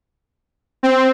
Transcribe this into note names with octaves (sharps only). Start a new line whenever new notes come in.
C4